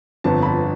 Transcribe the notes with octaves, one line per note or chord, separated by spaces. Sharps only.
G1 F2 D3 F3 B3 A5
B5
A5